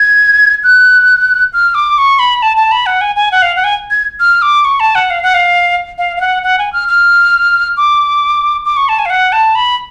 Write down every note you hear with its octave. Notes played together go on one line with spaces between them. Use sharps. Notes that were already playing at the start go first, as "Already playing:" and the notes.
Already playing: G#6
F#6
F6
D6
C#6
B5
A5
A5
B5
F#5
G#5
G#5
F#5
F5
F#5
G#5
G#6
F6
D6
C#6
A5
F#5
F5
F#5
F5
F5
F5
F#5
F#5
G#5
F6
F6
D6
D6
C#6
A5
G#5
F5
F#5
A5
B5